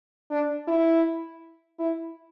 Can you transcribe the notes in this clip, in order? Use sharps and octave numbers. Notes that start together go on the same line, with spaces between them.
D4
E4
E4